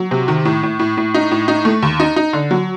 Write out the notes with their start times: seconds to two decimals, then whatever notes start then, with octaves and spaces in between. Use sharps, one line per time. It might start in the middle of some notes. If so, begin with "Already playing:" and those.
Already playing: F#3
0.11 C3
0.28 D#3
0.45 A2
0.63 A2
0.79 A2
0.97 A2
1.14 D#4
1.31 A2
1.48 D#4
1.65 A3
1.83 D#2
2.00 D#4
2.16 D#4
2.33 D3
2.51 F#3